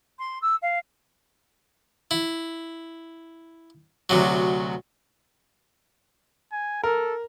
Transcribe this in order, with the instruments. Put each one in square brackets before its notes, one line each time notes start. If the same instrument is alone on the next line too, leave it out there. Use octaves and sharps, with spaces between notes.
[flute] C6
E6
F5
[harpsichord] E4
D2 C3 F#3
[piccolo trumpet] G#5
[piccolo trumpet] A4 [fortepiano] A#4